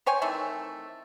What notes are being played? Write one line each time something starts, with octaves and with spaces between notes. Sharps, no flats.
C5 C#5 G5 G#5
D#3 E3 A3 C4